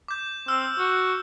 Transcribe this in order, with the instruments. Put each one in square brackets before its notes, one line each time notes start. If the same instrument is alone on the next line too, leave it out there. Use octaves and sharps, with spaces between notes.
[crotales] D6 G6
[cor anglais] C4 [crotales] E6 F6
[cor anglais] F#4